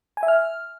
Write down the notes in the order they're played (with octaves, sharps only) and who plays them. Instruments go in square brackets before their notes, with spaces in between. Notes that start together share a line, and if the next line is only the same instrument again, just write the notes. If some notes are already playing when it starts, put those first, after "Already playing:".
[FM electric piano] G#5
E5
F6